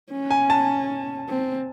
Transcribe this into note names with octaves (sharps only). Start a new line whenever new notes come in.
C#4
G#5
A5
C4